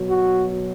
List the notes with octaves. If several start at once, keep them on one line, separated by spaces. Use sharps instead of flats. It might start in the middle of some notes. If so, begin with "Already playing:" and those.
Already playing: B2 F#3
F#4